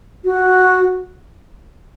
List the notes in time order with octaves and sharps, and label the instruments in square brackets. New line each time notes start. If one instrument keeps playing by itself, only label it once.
[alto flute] F#4